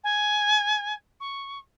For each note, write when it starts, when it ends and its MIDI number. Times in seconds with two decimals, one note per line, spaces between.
0.03 0.94 80
1.20 1.58 85